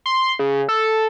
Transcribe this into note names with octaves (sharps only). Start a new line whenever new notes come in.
C6
C#3
A4